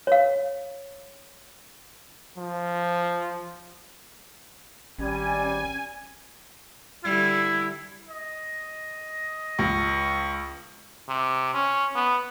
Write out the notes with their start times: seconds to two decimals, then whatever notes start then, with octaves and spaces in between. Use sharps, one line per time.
0.07 C#5 F5
2.38 F3
4.98 G#1 G3 C#4 G#5
7.04 D3 G3 E4
8.09 D#5
9.59 C#2 C#6
11.08 C3
11.54 C#4
11.96 B3